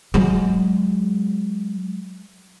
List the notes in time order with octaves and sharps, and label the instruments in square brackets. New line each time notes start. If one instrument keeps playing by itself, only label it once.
[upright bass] F#3 G#3